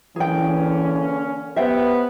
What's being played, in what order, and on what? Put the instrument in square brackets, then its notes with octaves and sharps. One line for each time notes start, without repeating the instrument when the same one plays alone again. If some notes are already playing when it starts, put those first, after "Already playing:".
[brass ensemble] D3 A#3 C#4 [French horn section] E3 [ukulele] G#4 G5
[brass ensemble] B3 [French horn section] G4 C5 [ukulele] E5 G5